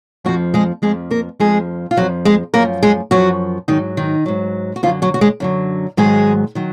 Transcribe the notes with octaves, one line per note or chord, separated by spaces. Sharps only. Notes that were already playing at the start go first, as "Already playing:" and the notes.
F2 F3 F#3 F#4
G#3 G#4
F2 F3 G#3 G#4
A#3 A#4
F2 F3 G#3 G#4
F4
F2 F3 F#3 F#4
G#3 G#4
F#2 F3 A#3 A#4
G#3 G#4
F#2 F3 F#3 F#4
G#2 D#3 F#3 D#4
D#3 D#4
G#2 F#3
F#4
F#2 D3 F3 F#3 F4
F#3 F#4
F#4
G#3 G#4
F#2 D3 F#3
G#2 D#3 F#3 G#3 G#4
D#3 F#3